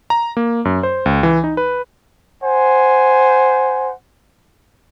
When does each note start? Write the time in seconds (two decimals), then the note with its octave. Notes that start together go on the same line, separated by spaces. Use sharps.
0.10 A#5
0.37 A#3
0.65 F#2
0.83 C5
1.06 C#2
1.23 E3
1.44 D#4
1.57 B4
2.43 C5 F#5 G#5